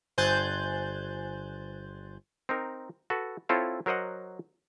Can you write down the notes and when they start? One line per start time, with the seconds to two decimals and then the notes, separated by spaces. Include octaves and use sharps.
0.18 G1 C5 G#5 F#6 G6 A6
2.49 C4 D#4 A#4
3.10 F#4 A4 B4
3.49 C4 E4 F4 A4 C#5
3.86 F#3 A#4 C5 D#5 F#5